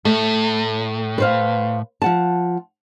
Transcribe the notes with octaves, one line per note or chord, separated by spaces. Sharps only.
A2 A3
B4 C5 F5
F3 F#5 A5